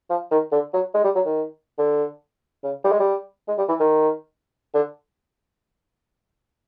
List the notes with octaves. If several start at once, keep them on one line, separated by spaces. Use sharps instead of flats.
F3
D#3
D3
F#3
G#3
G3
F#3
D#3
D3
C#3
G3
G#3
G3
G#3
G3
E3
D#3
D3